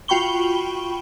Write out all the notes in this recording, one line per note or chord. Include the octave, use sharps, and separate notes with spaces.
F4 F#4 G5 B5 C#6 G7